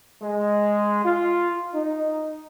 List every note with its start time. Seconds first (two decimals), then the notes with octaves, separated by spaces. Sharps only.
0.22 G#3
1.04 F4
1.75 D#4